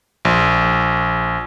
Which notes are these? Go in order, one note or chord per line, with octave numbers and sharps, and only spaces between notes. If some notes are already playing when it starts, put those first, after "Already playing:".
A#1